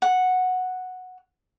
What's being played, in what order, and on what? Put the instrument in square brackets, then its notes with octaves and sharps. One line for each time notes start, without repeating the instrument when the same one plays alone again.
[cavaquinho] F#5